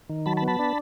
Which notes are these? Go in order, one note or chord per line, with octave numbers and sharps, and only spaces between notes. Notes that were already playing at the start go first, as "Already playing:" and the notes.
D#3
F#3 A5 B5
A5 B5
B3
A5 B5
D4